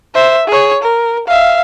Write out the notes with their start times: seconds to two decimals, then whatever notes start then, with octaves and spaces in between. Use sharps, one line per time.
0.14 C5 E5
0.47 G#4 C#5
0.83 A#4
1.27 E5 F5